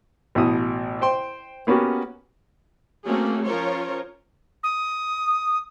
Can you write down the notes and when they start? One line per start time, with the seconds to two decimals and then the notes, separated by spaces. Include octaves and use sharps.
0.35 A1 B2 E5 D#6
1.01 C5 G5 C6
1.67 A#3 B3 C#4 F#4 G4
3.04 A3 A#3 C4 C#4 F#4 G#4
3.44 F3 C#4 F4 A#4 C5 C#5
4.63 D#6